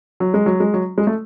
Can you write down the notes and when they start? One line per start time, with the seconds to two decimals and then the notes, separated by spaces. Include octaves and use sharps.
0.20 F#3
0.34 G#3
0.46 F#3
0.60 G#3
0.74 F#3
0.98 G#3
1.07 A3